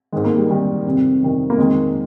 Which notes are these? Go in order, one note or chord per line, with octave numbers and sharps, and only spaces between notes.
G#2 D#3 G#3
A#3
G3
G#2 D#3 G3
F2 C3 D#3
F2 C3 D#3
A#3
F2 D#3 G#3